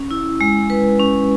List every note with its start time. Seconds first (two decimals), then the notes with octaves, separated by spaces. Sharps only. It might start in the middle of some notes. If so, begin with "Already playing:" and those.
Already playing: C#4
0.11 E4
0.41 G#3
0.70 B4
0.99 C#4